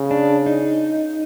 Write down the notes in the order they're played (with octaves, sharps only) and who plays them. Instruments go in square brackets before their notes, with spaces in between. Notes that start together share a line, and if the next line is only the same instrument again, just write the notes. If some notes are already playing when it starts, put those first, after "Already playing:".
Already playing: [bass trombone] C#3
[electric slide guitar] D4
D#4